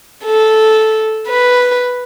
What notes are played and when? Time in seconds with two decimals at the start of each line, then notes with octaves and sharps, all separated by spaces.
0.25 A4
1.28 B4